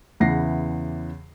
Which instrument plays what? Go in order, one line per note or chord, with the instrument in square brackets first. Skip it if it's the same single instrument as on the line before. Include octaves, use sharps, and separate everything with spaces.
[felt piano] E2 C#3 E3 F#5 A#6 C7